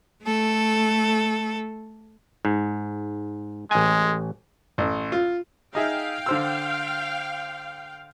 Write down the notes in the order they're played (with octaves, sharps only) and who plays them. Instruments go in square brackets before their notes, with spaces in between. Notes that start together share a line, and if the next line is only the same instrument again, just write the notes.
[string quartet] A3 A4
[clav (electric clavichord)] G#2
[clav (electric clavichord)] A1 G#5 [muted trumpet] G#3
[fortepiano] A1
F4
[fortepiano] D#4 G#4 E5 [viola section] F5 G5
[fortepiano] D3 C5 E6